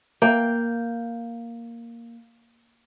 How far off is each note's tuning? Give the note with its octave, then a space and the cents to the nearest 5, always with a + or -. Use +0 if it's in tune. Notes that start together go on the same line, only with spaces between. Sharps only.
A#3 +0 G5 +0